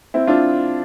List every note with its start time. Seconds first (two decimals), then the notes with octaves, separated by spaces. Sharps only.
0.14 C4 E4
0.27 D4 F4